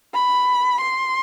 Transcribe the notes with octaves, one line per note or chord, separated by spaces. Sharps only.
B5
C6